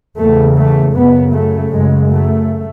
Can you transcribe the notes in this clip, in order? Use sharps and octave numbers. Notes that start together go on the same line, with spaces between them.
E2 C#3 A3
A3
F#2 C#3 B3
A3
F#2 C#3 G#3
A3